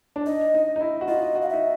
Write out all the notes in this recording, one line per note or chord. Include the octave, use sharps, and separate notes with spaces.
D4
D#4 D#5
D#4
D#4
E4
F#4
F4 D#5
F#4
F5
D#4 E5